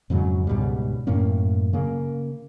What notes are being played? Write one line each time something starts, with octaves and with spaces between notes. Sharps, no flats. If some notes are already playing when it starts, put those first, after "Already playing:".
F2 G#2 C#3 F#3
C#2 G#2 B2 G3
F#2 A2 A#3 C#4
C#3 A#3